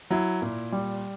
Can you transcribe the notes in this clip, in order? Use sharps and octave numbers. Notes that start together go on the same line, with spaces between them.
F#3 E4
A#2
G3